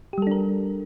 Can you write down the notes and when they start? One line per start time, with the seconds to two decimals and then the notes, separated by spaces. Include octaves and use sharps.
0.13 G4
0.18 G3
0.22 A4
0.27 D4
0.31 A#4